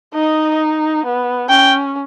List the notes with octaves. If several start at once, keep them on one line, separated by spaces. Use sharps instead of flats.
D#4 D#5
B3
C#4 G5